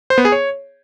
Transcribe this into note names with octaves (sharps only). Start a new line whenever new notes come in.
C5
B3
G#4
C#5